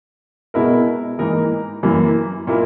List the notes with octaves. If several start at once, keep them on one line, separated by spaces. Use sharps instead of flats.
B2 G#3 B3 E4 A#4
G#2 E3 A#3 D#4 A#4
F#2 E3 A#3
A#2 A#3 E4 A#4